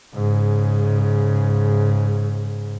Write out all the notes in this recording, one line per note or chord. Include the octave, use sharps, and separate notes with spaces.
G#2 C#3